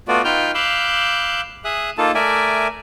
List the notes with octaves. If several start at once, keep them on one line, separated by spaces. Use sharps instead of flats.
A3 B3 F4 F#4 D5
D#4 F4 B4 G5 F6 G6
F5 B5 D6 E6 F#6 G6
G#4 E5 D#6 F#6
A#3 D#4 F4 A4 A5
A3 A#4 D5 E5 G#5